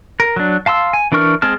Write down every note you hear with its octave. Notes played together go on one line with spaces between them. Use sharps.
A#4
F#3 D4
F5 A5 C6 E6
G#5
E3 D4 A#4 C#6 F6
G#3 C4 G#4 A5 F6